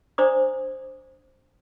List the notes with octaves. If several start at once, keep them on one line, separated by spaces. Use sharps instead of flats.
D4 C5 D5 A#5 D6 D#6